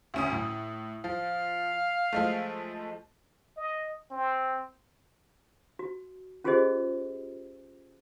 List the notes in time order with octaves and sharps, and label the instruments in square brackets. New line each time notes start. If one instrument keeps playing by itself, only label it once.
[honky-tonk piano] D2 C#4 D#6
A2
[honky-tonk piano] F3 [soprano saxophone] F5
[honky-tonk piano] F3 G#3 A3
[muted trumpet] D#5
C4
[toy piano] F#4
C#4 F4 G4 G#4 C5 D#5